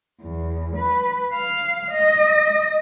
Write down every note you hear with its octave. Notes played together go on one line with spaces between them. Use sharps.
E2
B4
F5
D#5